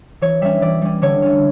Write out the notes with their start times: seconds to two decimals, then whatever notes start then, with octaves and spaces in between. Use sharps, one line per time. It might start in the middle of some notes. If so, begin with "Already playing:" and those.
0.21 E3 C#5
0.41 G3 C#4 E5
0.62 E3 D5
0.81 G3 C#4
1.02 D3 C#5
1.22 A3 C#4